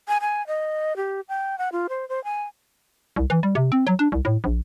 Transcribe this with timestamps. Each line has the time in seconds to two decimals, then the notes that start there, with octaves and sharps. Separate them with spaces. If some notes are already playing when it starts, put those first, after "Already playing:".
0.08 G#5
0.21 G#5
0.47 D#5
0.97 G4
1.29 G5
1.58 F#5
1.72 F4
1.89 C5
2.09 C5
2.24 G#5
3.16 C2
3.30 E3
3.43 G3
3.55 C3
3.72 C4
3.87 F#3
3.99 D4
4.12 C2
4.25 A2
4.44 A#1